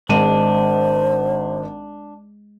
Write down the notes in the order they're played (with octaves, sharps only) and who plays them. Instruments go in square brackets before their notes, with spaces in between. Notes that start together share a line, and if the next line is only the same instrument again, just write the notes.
[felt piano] G#1 D#7 [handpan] G#3 [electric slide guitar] D4 [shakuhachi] C5